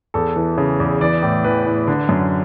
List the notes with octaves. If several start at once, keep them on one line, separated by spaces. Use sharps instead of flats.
E2 A4
E3
C#3
E2
E3 D5
A2
E3 B4
A2
D3
F#2